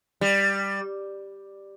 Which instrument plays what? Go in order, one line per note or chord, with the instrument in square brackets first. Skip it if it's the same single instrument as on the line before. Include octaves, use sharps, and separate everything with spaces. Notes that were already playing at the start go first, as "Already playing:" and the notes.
[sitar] G3